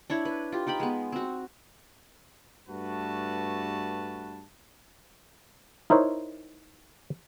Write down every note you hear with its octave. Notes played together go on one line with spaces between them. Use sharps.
D4 E4 C#5
B4
F4 G4
D#4 G4 G5 B5
G#3 B3
C4 F#4
G2 A3 D4 F#4 B4 A5
D#4 E4 A#4 C5 C#5